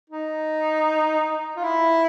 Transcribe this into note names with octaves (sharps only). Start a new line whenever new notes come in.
D#4
F4
E4